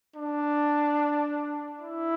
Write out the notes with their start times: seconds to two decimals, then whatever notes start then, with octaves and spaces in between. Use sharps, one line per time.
0.16 D4
1.81 E4